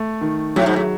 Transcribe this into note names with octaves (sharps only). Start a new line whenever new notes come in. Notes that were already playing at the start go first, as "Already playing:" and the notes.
Already playing: A3
D#3
A2 F#3
G#2
A2